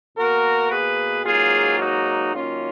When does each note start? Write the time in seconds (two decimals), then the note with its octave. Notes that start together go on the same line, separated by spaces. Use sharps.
0.17 B2 A#3 F#4 A#4
0.72 G#4 B4
1.25 G#2 F#3 A#3 F4 G#4
1.80 D#4 F#4
2.34 F#2 D#3 A#3 C#4 F4